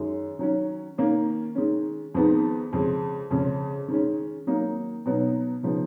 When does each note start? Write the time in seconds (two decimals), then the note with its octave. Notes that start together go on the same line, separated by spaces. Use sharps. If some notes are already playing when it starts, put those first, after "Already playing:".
Already playing: F#2 D#3 G#3
0.39 D#3 F#3 C#4
0.98 D#3 A#3 C#4
1.55 D#3 G#3 C#4
2.15 F2 D#3 G#3 B3 D#4
2.73 F2 C#3 G#3
3.31 F2 C#3 G#3 C#4
3.88 D#3 G#3 C#4
4.47 D#3 F#3 A#3 D#4
5.06 B2 F#3 B3 D#4
5.63 C#3 F3 B3 D#4